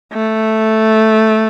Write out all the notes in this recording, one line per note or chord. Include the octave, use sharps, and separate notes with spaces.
A3